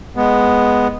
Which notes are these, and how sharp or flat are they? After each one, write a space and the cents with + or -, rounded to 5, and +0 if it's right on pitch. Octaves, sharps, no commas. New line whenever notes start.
G#3 +0 B3 +0